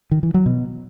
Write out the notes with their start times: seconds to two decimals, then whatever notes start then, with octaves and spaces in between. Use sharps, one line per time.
0.11 D#3
0.23 E3
0.34 F#3
0.46 B2